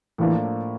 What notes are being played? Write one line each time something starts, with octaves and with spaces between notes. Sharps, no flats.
A2 E3 F3 A#3 D4